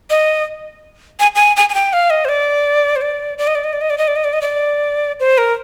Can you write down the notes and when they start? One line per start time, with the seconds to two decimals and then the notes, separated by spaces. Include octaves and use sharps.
0.10 D#5
1.20 G#5
1.35 G#5
1.57 G#5
1.69 G#5
1.74 G5
1.93 F5
2.10 D#5
2.25 C5
2.29 D5
2.96 C5
3.01 D5
3.38 D5
3.47 D#5
3.55 D5
3.64 D#5
3.73 D5
3.81 D#5
3.90 D5
3.98 D#5
4.08 D5
4.16 D#5
4.24 D5
4.33 D#5
4.42 D5
5.20 C5
5.38 A#4